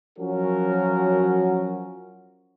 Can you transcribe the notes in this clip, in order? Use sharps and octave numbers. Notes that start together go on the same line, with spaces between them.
F3 F#3 C#4 F#4 A#4